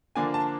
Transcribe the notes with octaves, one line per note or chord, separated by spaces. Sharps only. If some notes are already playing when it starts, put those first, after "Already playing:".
D3 F3 A#3 D4 G#5
A5